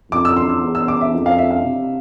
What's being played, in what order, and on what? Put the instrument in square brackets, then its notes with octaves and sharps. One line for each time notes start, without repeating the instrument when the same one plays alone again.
[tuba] F2 [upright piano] D6
[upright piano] E6
C6
E6
[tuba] E2
[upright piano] E6
D6
E5
[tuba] F2
[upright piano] F5
E5
F5
[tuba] C3